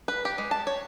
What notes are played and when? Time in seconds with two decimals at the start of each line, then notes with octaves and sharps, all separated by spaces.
0.08 B4
0.25 G4
0.38 G#3
0.51 A5
0.67 C#5